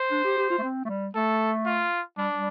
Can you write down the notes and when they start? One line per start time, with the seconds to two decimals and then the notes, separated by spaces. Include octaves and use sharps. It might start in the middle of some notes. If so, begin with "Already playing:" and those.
Already playing: C5
0.11 D4
0.24 G4
0.38 G4
0.50 F4
0.59 A3
0.63 C4
0.85 A3
0.89 G3
1.15 A3 A4
1.66 F4
2.18 G3 D4
2.35 G3